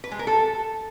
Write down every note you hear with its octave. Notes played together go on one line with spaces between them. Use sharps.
B4
G#3
A#4
A4